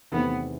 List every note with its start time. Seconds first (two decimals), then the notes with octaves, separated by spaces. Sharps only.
0.12 E2 C3 D#3 A3 B3 C4